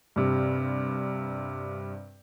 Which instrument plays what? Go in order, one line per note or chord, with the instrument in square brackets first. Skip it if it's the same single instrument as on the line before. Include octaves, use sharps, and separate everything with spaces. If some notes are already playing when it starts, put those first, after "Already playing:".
[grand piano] G2 C3